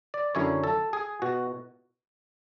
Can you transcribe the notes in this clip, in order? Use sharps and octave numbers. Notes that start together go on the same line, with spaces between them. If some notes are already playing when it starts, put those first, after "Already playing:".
D5
F#2 D3 F#3 C#4 E4 C#5
A4
G#4
B2 F#4